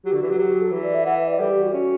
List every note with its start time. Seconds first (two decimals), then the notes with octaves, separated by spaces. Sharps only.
0.05 F#3 G4
0.13 D3 F#4
0.22 E3
0.27 F#3 G4
0.38 F#3 G4
0.49 G4
0.61 A4
0.71 E3
0.83 D5
0.95 E5
1.05 E3 F#5
1.18 E5
1.28 D5
1.40 G3 A4
1.51 G4
1.62 F#4
1.73 C#4 F#4